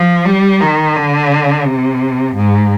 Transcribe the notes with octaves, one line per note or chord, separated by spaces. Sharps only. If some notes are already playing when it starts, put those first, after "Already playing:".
Already playing: F3
G3
D#3
D3
C3
G#2